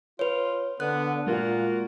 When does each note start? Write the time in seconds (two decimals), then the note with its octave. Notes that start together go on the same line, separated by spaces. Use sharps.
0.19 F4 B4 C#5
0.80 D3 B3 F#6
1.27 A#2 G#3 A#3 F4 F#4